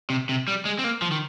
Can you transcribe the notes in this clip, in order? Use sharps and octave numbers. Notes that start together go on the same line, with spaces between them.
C3
C3
G3
G#3
C4
A#3
F3
D#3